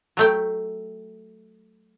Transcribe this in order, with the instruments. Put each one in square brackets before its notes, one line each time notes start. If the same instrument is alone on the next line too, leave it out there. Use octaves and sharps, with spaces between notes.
[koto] F#3 A3 G5